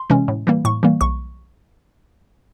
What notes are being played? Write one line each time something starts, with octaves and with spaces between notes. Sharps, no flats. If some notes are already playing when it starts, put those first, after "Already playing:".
Already playing: C6
C3 E3 G#3 C#4
A2
E3 G3 A#3
A2 C#6
E3 G3 A#3
B1 C#6